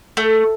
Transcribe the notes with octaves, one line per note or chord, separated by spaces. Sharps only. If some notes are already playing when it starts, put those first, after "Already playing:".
A3